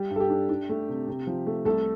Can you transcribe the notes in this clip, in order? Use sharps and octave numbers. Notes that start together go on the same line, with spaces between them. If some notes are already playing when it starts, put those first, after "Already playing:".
Already playing: G3 G4
G2
A4
G4
D4
D4
A3
C3
C3
F3
A3
C2 A3 A4